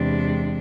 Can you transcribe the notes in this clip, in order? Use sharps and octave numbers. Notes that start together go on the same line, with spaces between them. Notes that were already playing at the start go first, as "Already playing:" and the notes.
Already playing: E2 C3 G#3 D4